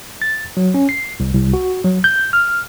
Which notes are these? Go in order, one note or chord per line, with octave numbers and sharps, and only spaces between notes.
A6
F#3
C#4
C7
C2
C2
F#4
F#3
G6
F6